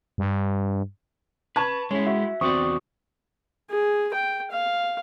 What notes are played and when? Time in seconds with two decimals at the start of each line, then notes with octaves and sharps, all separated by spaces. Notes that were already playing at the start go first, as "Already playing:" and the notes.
0.18 G2
1.56 B4 A5 C#6 G#6
1.91 G#3 C#4 E4
2.07 F#4 E5
2.41 E2 C4 F#4 D5 C#6 D#6
3.70 G#4
4.14 G5
4.51 F5